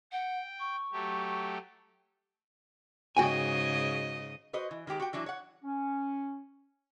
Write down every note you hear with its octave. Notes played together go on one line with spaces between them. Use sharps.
F#5 G5
C#6
F#3 A3 G4
G#2 C#3 F#4 D#5 G5 G#5
F#4 B4 C5 D#5
E3
D#3 G#3 G4 A#5
F#4 G5
E3 F#3 D4 E4
C#5 F#5
C#4